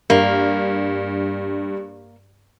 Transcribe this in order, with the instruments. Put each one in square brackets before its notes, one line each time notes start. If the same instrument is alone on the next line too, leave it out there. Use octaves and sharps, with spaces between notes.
[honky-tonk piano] G2 [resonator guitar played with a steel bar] A#3